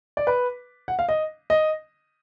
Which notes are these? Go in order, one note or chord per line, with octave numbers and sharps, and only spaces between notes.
D5
B4
F#5
F5
D#5
D#5